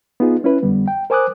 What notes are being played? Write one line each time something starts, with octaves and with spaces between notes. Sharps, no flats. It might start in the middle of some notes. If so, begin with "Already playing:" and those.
B3 D#4 F4 G#4
C#4 E4 B4
F2 D3 G3 B3
G5
A#4 C5 G#5 D6 D#6 F#6